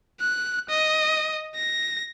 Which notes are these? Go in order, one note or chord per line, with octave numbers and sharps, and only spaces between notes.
F#6
D#5
A#6